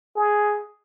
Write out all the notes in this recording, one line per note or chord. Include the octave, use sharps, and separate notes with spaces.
G#4